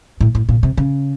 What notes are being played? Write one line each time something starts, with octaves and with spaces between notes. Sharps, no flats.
A2
A2
A#2
C3
C#3